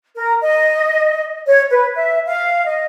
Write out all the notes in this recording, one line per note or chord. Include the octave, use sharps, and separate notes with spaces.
A#4
D#5
C#5
B4
E5
F5
D#5